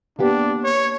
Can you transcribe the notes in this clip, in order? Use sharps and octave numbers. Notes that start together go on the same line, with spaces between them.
A#3 B3 D4 G4
C#5